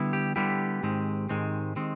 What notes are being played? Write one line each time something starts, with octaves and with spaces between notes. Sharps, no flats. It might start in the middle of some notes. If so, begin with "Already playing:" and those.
Already playing: D3 G3 B3 E4
G4
D3 G3 B3 E4 G4
G#2 D#3 G#3 C4
G#2 D#3 G#3 C4
D#3 G#3 C4